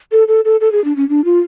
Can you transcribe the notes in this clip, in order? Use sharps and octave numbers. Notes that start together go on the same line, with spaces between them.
A4
A4
A4
A4
G#4
D4
C#4
D4
F4